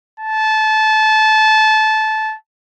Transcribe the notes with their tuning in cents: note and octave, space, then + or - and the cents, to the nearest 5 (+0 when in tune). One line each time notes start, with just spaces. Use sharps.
A5 -20